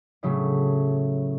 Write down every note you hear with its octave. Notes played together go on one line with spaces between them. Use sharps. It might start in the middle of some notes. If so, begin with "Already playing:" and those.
A2 C#3 F#3 A3